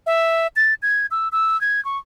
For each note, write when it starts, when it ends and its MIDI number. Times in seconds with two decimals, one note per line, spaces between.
0.06 0.47 76
0.56 0.74 93
0.82 1.06 92
1.11 1.28 88
1.32 1.59 88
1.61 1.83 92
1.85 1.98 85